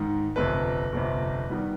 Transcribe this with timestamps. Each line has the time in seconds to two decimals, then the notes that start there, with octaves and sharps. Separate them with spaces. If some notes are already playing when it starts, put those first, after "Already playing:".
Already playing: G#2 D#3
0.36 G1 F2 C3 B4
0.92 G1 F2 C3
1.49 D#3 G3 B3